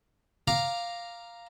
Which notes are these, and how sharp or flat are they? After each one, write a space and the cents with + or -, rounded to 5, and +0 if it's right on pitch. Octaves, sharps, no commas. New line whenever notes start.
F5 +0 A#5 +0 D6 +0